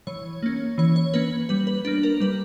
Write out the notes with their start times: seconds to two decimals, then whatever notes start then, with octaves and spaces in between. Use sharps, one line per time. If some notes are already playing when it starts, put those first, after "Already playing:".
0.07 E3 C#5
0.43 A#3 C#4
0.78 E3 C#5
0.96 C#5
1.14 A#3 C#4 B4
1.49 G3 B4
1.67 B4
1.85 A#3 D4 B4
2.03 A#4
2.20 G3 B4